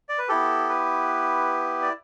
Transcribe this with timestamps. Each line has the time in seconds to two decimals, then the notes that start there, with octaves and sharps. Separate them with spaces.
0.09 D5
0.19 B4
0.29 B3 E4 G4 A4
0.69 B4
1.82 D5